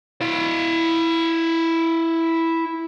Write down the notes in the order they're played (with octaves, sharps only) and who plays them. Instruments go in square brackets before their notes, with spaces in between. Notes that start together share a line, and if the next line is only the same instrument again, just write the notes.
[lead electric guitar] E4 F5